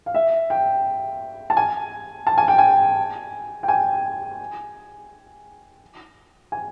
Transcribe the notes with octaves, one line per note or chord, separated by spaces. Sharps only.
F5
E5
G5
A5
G#5
A5
G#5
G5
G#5
G5
G#5
G#5